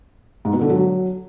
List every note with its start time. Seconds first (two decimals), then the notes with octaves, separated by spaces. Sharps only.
0.45 G#2
0.53 B2
0.61 D3
0.70 F#3